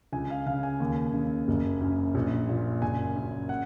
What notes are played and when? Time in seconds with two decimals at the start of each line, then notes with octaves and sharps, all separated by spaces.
0.13 C#2 G#5
0.30 F5
0.46 C#3 F5
0.63 G#5
0.80 D#2
1.14 C#3
1.48 F#1
1.81 F#2
2.15 A#1
2.49 A#2
2.82 F#1 G#5
3.16 F#2
3.49 F#5